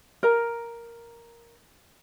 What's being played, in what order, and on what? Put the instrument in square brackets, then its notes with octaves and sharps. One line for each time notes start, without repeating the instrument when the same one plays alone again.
[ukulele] A#4 A#5